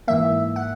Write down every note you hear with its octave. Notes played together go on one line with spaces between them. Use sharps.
G#2 E3 A#3 E5
F#5